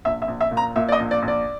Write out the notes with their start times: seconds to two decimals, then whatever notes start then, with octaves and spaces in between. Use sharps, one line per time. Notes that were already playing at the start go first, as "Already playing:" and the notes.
0.05 A#1 E5
0.22 E5
0.28 A#1
0.41 E5
0.51 A#2
0.57 A#5
0.76 A#2 E5
0.89 D5
0.92 D#5
0.99 A#1
1.11 D5
1.22 A#1
1.28 D5